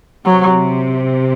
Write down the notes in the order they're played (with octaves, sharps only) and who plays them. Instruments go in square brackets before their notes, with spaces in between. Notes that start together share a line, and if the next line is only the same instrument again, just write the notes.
[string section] C3 [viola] F#3